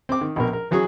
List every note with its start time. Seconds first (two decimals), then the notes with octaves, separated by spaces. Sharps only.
0.09 C4 D6
0.21 D#3
0.36 A#1 B2 A#4
0.53 A#4
0.71 E3 F#3 F#4 G#4